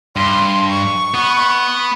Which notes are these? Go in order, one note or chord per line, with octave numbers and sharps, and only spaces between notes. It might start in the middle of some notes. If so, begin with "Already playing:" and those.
G2 C6
C#6
B3